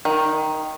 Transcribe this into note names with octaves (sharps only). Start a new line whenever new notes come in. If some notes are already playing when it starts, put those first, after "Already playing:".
D#3